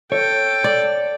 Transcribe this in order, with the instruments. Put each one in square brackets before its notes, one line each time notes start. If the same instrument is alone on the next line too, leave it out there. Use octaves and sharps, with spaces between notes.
[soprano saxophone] A4 [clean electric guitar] C#5 [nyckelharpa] G5
[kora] D5